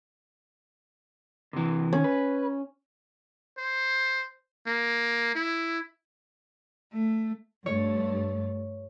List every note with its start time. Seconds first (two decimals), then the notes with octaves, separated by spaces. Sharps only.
1.53 C3 E3
1.93 C3 D#3 C#4
2.04 B4
3.58 C5
4.67 A#3
5.35 E4
6.93 A3
7.66 G2 A3 C#5